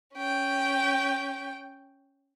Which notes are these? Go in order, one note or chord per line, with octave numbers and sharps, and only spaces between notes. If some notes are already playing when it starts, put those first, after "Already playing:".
C#4 G5